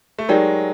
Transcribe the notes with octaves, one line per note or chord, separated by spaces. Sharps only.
A3
F#3 G#3 D#4 G4 A#4 D5 G5